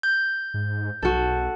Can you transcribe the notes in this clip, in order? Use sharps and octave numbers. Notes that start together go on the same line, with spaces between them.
G6
G#2
B1 F#4 A4